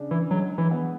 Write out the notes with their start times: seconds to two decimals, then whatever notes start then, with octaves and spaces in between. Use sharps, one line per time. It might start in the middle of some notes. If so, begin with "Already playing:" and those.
Already playing: C#3 D4
0.11 E3
0.31 F#3 G#3
0.58 E3
0.71 B3